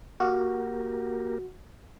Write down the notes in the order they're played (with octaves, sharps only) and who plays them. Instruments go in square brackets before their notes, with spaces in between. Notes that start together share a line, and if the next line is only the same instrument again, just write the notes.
[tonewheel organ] A#3 G4 A#4 [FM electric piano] F#4